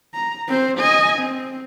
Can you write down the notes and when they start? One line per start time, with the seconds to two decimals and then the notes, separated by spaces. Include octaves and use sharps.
0.14 A#5
0.48 C4 C5
0.78 D#5 G#5
1.19 C4